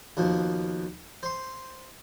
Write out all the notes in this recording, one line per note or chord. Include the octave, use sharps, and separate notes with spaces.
D#2 B2 F3
C5 C6